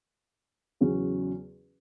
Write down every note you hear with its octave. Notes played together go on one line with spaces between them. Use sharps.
E2 C#3 F#3 C#4 F#4